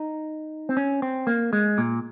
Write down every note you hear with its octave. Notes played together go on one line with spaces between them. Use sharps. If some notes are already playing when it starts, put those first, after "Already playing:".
Already playing: D#4
C4
C#4
C4
A#3
G#3
A#2